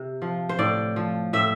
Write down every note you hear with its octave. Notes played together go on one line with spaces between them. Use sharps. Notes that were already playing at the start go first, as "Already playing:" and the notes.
Already playing: C3
F3
C5
A2 D5
F3
A2 E5